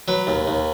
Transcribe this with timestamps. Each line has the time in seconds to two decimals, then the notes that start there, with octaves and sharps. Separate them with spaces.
0.08 F#3 B4
0.27 D#2
0.48 D#2